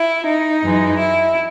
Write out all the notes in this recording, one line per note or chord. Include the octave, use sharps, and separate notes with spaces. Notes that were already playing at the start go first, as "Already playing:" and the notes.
Already playing: E4
D#4
F#2 E3 G#3
E4